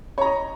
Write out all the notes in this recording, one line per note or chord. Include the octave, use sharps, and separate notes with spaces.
C#5 D#5 A#5